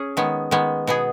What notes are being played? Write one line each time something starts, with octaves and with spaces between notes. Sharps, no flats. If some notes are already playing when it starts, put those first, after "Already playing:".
Already playing: C#4 G#4
D#3 G#3 B3
D#3 G#3 B3
B2 B3 G#4